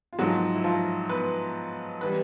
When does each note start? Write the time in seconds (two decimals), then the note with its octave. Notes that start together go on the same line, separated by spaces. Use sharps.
0.13 F4
0.19 G#2 F3 F#3 F#4
0.55 E4
0.64 F3 F4
1.09 B3 B4
2.01 E3 G3 B3 B4